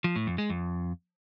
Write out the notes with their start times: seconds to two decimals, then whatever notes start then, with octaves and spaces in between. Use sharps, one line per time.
0.04 F3
0.16 A2
0.27 F2
0.38 G#3
0.50 F2